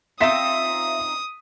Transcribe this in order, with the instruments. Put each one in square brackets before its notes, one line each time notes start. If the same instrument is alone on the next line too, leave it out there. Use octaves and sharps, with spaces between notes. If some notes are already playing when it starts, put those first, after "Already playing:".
[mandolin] C4 D#4 F4 [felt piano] E5 B6 E7 [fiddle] D#6